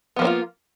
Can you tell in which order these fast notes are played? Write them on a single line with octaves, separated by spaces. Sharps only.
B3 F3 A#3 D4 F4